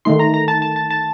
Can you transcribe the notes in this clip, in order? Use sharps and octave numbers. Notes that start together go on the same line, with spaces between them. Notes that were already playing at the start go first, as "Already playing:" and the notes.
D#3 A3 D#4 C6
A#5
A#5
A5
A5
A5
A5